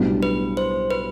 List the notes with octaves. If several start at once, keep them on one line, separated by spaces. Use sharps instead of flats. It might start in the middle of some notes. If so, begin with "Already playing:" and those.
Already playing: B1 A2 G3 B3 D4
B4
C5
B4